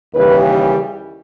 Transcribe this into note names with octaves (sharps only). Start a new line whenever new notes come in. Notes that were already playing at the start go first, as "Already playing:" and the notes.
D#2 C#3 E3 G3 B4